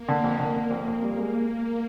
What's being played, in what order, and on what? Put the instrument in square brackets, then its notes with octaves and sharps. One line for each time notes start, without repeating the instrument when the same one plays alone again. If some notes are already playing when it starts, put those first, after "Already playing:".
Already playing: [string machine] A#3
[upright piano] D3
F2
D3
D3
F2
F2
G3
G#3